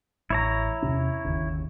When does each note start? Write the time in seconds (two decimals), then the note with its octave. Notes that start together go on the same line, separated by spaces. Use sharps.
0.30 A1 E4 C#5 A#5
0.82 E2 C3 C#4
1.25 G1 D#2 C#3